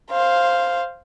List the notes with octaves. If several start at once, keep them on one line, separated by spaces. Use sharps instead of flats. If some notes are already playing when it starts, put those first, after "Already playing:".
C5 F5